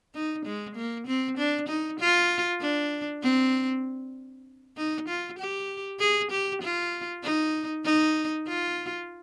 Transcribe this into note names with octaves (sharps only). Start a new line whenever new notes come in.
D#4
G#3
A#3
C4
D4
D#4
F4
D4
C4
D#4
F4
G4
G#4
G4
F4
D#4
D#4
F4